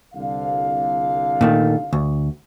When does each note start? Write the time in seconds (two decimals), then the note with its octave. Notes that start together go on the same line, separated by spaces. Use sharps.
0.14 C2 D3 F5
1.41 A#2 D#3 A3
1.93 D2